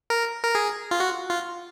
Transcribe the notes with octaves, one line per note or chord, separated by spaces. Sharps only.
A#4
A#4
G#4
F4
F#4
F4